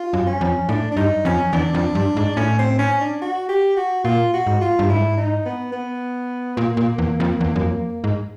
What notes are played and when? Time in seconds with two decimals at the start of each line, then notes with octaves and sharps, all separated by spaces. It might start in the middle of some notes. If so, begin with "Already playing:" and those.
Already playing: F4
0.13 F#2
0.27 C#4
0.41 F2
0.69 A2 D4
0.92 D4
0.96 G2 D#4
1.25 F2 C#4
1.53 E2 D4
1.74 F2
1.95 G2
2.17 G#2
2.36 A2 C#4
2.58 C4
2.78 C#4
3.00 D4
3.21 F#4
3.49 G4
3.77 F#4
4.04 A#2 F4
4.33 F#4
4.47 G#2
4.61 F4
4.79 G2
4.89 G#2 E4
5.17 D#4
5.45 B3
5.72 B3
6.57 A#2 A#3
6.77 A#2
6.98 E2
7.20 F2
7.41 E2
7.56 F#2
7.62 F2
8.04 G#2